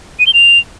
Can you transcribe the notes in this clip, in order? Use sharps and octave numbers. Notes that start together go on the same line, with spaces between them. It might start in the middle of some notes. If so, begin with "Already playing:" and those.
D#7
G7
F7